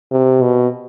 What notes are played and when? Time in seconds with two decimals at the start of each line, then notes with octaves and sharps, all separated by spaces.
0.12 C3
0.42 B2